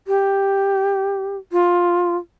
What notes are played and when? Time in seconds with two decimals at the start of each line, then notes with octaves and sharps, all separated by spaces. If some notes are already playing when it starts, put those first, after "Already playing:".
0.07 G4
1.52 F4